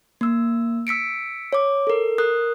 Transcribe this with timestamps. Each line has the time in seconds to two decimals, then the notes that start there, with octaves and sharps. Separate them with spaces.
0.21 A#3 E6
0.87 E6 B6 C#7 D7
1.53 C#5 D6
1.87 A4 A#4
2.18 A#4 D#6 F#6